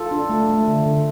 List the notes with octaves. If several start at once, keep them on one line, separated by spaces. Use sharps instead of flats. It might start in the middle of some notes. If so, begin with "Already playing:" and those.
Already playing: F4 A4
D4
A3
A3
D3
D3